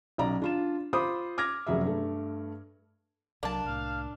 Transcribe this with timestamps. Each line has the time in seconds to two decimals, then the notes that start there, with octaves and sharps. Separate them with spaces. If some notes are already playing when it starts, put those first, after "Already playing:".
0.18 B1 C#4 D5 A#5
0.42 D4 F4 E7
0.93 F4 C5 B5 D6 D#6
1.38 D6 F6 G#6 A#6
1.66 F1 F#2 F#3 G#4 E5
1.84 G2 A3
3.43 C2 F#3 A#3 D4 A5
3.65 C2 A2 F5